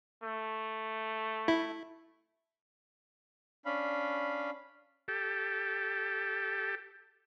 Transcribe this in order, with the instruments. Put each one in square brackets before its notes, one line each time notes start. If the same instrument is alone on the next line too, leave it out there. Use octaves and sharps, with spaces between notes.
[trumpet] A3
[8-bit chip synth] E4
[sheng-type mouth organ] C#4 D4 F5 B5
[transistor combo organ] G4 A4